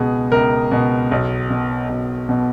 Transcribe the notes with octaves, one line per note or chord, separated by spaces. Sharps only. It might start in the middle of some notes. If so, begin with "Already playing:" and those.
Already playing: C#2 B2 G#4
C#2 A#4
B2
B1
B2
B1
B2